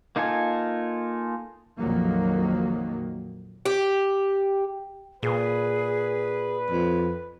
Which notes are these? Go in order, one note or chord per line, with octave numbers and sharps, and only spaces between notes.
A#3 D#4 F4 A4 G#5
A#1 F2 D#3 F#3 A#3
G4
A#2 G#4 B4
F2